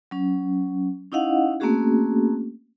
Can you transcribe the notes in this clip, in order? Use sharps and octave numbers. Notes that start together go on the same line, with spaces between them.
F#3 C#4
C#4 D#4 E4 D#5 F5 F#5
A3 A#3 C4 C#4 F#4 G#4